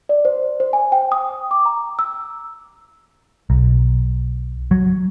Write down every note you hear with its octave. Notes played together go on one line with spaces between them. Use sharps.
D5
C5
C5
G#5
G5
D#6
D6
A#5
E6
B1
F#3